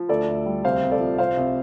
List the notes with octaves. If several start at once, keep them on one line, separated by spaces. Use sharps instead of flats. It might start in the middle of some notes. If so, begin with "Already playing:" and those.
Already playing: F3
D2 A4 D5
D2
G3
C2 C5 F5
C2
A4 D5
F3
C2 C5 F5
C2